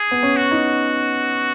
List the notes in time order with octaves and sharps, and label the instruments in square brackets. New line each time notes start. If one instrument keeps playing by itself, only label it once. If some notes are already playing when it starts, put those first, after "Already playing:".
Already playing: [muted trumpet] G#4
[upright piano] B3
C#4
[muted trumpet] F#4
[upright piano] D#4